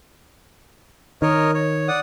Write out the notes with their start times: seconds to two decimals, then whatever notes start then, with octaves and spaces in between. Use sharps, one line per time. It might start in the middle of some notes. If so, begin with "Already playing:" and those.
1.22 D#3 A#4 C#5 D#5
1.54 C#5
1.88 D5 F#5 D#6